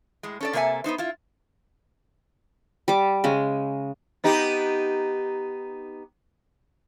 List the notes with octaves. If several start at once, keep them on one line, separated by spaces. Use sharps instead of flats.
A2 G#3
C#4 A4 D5
C3 A#3 A4 C#5 E5 G#5
B3 C4 D#4 C5
E4 F4
G3 D6
C#3 G#3
B3 D#4 G4